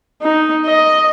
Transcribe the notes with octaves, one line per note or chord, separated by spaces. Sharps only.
D#4
D#5